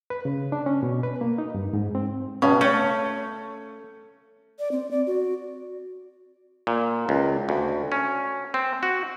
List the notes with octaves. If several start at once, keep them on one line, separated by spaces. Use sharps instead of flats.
B4
C#3
D4
C#4
B2
B4
A#3
D#4
G2
G#2
C4
C#2 G2 B2 C#4
A3 C#4 C#5
D5
C4
D5
F#4
A#2
C#2
D2
C#4
C4
F#4